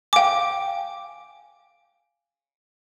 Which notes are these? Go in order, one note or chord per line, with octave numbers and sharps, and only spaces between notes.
F5 G5 G#5 D6